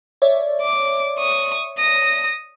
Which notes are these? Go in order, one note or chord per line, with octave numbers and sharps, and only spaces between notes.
C#5 D5 E5
D6
C#6 D#6
D#6 A#6